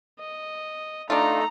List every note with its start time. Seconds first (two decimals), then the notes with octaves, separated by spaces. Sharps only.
0.20 D#5
1.10 A3 D4 D#4 F4 A4 A#5